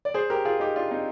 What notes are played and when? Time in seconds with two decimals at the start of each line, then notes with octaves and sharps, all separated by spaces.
0.05 D5
0.14 G#4 C5
0.30 G4 A#4
0.45 F4 G#4
0.60 D#4 G4
0.76 D4 F4
0.91 C4 D#4